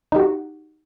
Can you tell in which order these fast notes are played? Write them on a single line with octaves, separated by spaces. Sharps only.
D#4 G4 F#4